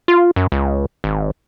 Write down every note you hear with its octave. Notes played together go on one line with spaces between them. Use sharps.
F4
F#2
C#2
G#1